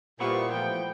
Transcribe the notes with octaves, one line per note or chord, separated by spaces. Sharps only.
A#2 G3 B3 E4 G4 C5 C#6
E3 F3 A3 G5